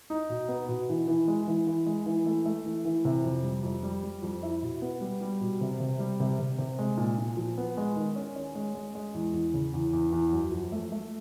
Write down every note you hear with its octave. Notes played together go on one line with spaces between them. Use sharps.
D#4
B2
B3
B2
E3
E3
G#3
E3
E3
G#3
E3
A3
A3
E3
E3
C3
F2
G3
F2
G3
G3
F2
E4
B2
B3
G3
G3
B2
C3
C3
G3
C3
C3
C3
G#3
A#2
A#2
F3
B3
G#3
D#3
C#4
C#4
G#3
G#3
G#3
E2
E2
C#3
E2
E2
E2
F#2
F3
A3
A3